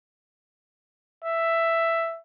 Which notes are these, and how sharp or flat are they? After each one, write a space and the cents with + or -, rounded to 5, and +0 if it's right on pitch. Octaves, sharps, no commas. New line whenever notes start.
E5 +10